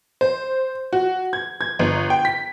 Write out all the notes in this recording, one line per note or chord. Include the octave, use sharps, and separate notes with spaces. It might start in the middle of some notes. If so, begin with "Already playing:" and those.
C5
F#4
G#6
G#6
G1
G5
B6